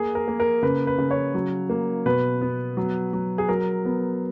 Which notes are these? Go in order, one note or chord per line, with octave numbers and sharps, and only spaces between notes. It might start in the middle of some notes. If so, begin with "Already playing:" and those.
Already playing: A#3 G#4
A#4
A#3
A#4
C#3 B4
B4
C#3
C#5
F#3
A#3
B2 B4
B3
F#3
F#3
G#4
F#3 A#4
B3